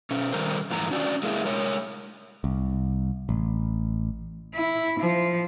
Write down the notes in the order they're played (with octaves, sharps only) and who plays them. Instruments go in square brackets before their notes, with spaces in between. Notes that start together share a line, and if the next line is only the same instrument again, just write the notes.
[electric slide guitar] B2 C#4
D#3 G3 A#4 C5
F2 G#2 E3 A#5
C#4 D4 F#4 D5
G#3 A#3 E4
G#3 A#4 C#5
[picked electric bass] C2
A1
[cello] E4
F3